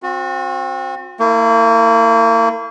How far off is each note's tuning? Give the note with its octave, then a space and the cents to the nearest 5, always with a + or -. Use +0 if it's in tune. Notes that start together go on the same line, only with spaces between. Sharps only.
C4 +15 F#4 -35
A#3 -35 E4 +0